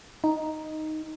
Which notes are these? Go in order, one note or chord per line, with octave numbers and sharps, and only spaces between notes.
D#4